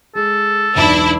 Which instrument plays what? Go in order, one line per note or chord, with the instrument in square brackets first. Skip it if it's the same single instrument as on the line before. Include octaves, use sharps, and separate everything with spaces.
[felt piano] G#3 [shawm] A4
[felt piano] E1 B1 [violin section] D4 E4